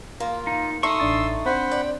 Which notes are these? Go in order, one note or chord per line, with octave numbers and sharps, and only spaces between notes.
A#3 F4
D#4
A3 D#4 C6 C#6 D#6 E6
A1 D4 A6
C4 D4 C5 F#5 B5
D5 G5